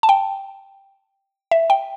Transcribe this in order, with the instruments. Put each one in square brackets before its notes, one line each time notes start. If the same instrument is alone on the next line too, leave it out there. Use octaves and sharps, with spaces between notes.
[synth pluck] A5
G5
E5
G5